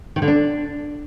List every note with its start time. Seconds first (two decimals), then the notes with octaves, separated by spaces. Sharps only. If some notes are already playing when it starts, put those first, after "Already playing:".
0.16 D#3
0.22 D3
0.28 D4